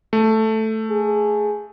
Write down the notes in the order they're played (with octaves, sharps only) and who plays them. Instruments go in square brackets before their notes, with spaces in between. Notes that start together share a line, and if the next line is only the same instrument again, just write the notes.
[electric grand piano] A3
[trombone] G#4